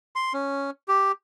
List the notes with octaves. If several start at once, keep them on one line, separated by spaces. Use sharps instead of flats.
C6
C#4
G4